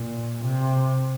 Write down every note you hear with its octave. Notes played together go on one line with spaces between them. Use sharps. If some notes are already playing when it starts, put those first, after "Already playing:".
Already playing: A#2
C3